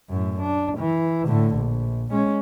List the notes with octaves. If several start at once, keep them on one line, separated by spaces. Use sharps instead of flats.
F#2 A2
D4
E3
A2 D3
A#1
G#3 C#4